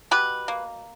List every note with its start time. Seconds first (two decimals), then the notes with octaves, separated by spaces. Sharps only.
0.11 B2 G4 B4
0.48 A#3